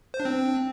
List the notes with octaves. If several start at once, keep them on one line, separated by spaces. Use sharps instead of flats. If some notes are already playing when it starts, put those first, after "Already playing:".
C5
D4
C4